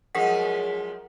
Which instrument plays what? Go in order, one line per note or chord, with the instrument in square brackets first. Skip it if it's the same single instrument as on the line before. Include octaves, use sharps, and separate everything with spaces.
[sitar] F#2 F3 G#3 [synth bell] G#4 A#4 B6 [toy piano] F#5